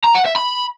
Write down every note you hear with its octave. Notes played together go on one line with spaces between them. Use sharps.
A#5
F#5
E5
B5